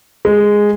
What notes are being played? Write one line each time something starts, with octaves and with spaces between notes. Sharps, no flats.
G#3